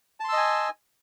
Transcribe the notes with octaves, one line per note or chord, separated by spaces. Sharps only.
D#5 G#5 A5 C6 E6